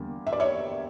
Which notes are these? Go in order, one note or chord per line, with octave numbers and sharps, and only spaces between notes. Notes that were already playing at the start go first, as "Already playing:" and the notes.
Already playing: E2 D3 G3 A#3
E5
D5
C#5 E5